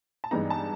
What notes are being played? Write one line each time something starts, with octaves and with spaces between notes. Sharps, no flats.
A5
G2 E3 G#3 B3 D#4 A#5
A5